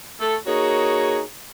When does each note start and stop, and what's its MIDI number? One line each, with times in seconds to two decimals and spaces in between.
0.20 0.37 57
0.20 0.37 69
0.47 1.20 58
0.47 1.20 63
0.47 1.20 66
0.47 1.20 68
0.47 1.20 73